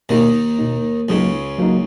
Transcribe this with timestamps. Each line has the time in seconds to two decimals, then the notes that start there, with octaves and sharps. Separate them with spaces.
0.09 D#2 B2 D#3 A#3 D#4
0.59 B2 A#3 D#4
1.09 C#2 C#3 F#3 A#3 D#4
1.59 F#3 A#3 D#4